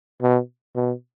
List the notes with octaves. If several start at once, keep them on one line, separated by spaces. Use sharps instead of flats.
B2
B2